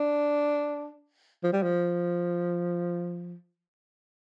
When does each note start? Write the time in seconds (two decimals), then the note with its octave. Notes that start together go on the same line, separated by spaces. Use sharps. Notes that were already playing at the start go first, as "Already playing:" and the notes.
Already playing: D4
1.44 F3
1.53 G3
1.63 F3